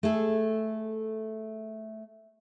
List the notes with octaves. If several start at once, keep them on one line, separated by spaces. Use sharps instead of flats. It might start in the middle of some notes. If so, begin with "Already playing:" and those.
A3 G#4 A4